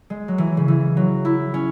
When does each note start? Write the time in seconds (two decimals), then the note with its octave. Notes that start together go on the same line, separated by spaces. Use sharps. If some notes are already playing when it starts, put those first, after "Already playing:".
0.10 G#3
0.28 F#3
0.38 E3
0.57 C#3
0.68 E3
0.97 F#3
1.25 E4
1.54 C#4